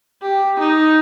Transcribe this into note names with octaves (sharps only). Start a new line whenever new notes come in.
G4
D#4